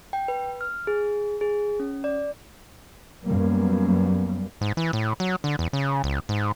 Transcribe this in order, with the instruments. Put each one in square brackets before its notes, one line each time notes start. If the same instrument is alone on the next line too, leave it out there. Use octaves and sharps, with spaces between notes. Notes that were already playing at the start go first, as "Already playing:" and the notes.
[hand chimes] G5
B4
F6
G#4
G#4
C#4
D5
[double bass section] F#2 G3 A#3 B3
[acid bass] G#2
E3
A2
F#3
D3
E2
C#3
C#2
G#2